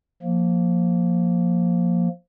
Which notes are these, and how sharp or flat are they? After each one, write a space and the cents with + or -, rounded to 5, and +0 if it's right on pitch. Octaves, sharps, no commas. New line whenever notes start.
F3 +10 A#3 +0